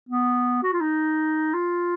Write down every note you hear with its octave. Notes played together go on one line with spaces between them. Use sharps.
B3
F#4
F4
D#4
F4